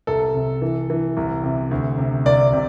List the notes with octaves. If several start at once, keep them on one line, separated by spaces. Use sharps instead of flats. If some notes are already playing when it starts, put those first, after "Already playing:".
C2 A4
C3
E3
E3
C2
C3
D2
C3
C2 D5
C3